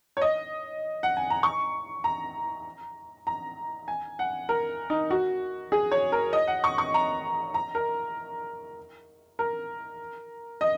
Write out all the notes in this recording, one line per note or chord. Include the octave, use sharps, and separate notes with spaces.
C#5
D#5
F#5
G#5
A#5
C#6
A#5
A#5
G#5
F#5
A#4
D#4
F#4
G#4
C#5
A#4
D#5
F#5
C#6
C#6
A#5
A#5
A#4
A#4
D#5